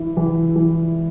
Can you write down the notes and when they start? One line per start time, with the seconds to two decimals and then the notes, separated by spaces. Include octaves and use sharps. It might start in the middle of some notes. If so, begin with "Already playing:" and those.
Already playing: E3 E4
0.17 E3
0.56 E3